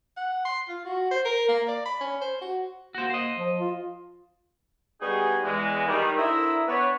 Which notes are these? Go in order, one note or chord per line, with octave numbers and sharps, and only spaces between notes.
F#5
C6
F4
F#4
C5
A#4
A#3
D5
B5
C#4
C5
F#4
A#3 F#4 C5
C5 D#5
F3
F4
G3 B3 D#4 F#4 G#4
E2 E3 G#3
D#3 G3
D3 E4 A#4 C5 D#6 E6
B3 D4 B4 C#5